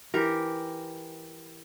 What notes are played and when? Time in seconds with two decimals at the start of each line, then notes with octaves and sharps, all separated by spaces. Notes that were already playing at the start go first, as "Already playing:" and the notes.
0.14 E3 G4 A#4